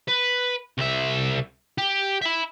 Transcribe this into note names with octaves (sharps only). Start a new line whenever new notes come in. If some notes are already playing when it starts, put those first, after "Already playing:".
B4
C2 E5
G4
E5 B5